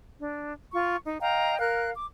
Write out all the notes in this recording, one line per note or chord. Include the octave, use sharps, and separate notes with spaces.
D4
F4 C#6
D#4
D#5 F5 G5 A#5
A#4 F5 F#6
D6